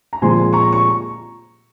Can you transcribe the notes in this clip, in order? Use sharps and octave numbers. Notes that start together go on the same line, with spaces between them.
A#5
A#2 F3 G#3 C4 G#5 C6
A#5 C#6
C#6